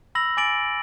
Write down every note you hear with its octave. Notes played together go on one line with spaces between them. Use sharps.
B5 E6 A#6 F#7
G#5 D6 A6 D7 F#7